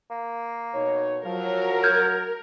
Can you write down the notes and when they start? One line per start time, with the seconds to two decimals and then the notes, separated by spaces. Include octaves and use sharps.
0.11 A#3
0.74 B2 D#4 C#5
1.25 F3 F#3 A#4
1.83 F6 G6 G#6